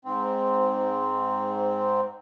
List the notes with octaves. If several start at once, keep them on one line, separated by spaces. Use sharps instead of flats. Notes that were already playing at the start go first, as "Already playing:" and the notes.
G#2 C4